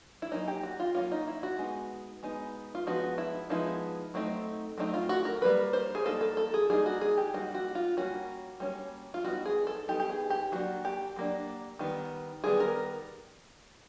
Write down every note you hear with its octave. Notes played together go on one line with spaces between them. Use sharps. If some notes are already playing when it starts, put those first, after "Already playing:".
E4
F#3 A#3 C#4 D#4
G4
F#4
F4
F#3 A#3 C#4 F4
D#4
E4
F#4
G#3 B3 D#4
G#3 B3 D#4
F4
F3 G#3 B3 D#4 F#4
E4
F3 G#3 B3 D#4 E4
F#3 A3 C4 D#4
F#3 A3 C4 D#4
F4
F#4
A#4
G3 A#3 D#4 B4
C5
G#4
G3 A#3 D#4 A4
A4
A4
G#4
G3 A#3 D#4 G#4
F#4
G#4
G4
G3 A#3 D#4 F#4
F#4
F4
G3 A#3 C#4 F#4
G3 A#3 C#4
F4
G3 B3 D#4 F#4
G#4
A4
G3 B3 D#4 G4
G4
G#4
G4
F#3 A#3 D4 F#4
G4
F#3 A#3 D4
D#3 G3 B3
D#3 G3 B3 G#4
A#4